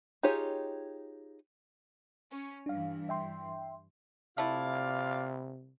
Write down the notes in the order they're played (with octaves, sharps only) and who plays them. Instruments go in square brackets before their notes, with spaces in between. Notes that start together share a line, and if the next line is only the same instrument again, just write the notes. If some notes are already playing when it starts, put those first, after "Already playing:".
[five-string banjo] D#4 F4 G4 G#4 C#5
[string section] C#4
[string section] G2 E3 [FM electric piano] D4 F5
[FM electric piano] E5 G5 C6
[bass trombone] C3 [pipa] A3 E4 [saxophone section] F4 D5 F5